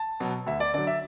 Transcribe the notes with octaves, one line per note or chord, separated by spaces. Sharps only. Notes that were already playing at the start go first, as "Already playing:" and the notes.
Already playing: A5
B2 F#3
D2 E5
D5
D3 F#3 D5
E5